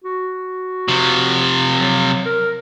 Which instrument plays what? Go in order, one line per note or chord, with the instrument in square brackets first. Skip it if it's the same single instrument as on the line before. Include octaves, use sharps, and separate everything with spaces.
[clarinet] F#4
[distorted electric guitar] C3 F3
[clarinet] F#3
A#4